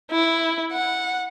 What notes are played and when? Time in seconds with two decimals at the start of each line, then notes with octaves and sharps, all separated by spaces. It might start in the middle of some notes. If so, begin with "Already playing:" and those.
0.11 E4
0.72 F#5